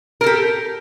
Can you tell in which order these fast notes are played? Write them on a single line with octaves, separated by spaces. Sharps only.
A#4 A4 G4